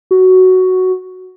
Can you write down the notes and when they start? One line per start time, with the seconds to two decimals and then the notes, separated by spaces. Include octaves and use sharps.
0.11 F#4